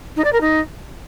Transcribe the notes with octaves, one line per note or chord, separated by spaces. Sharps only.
D#4
D5
A#4
D#4